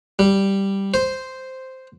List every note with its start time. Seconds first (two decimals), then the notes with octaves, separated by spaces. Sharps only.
0.19 G3
0.94 C5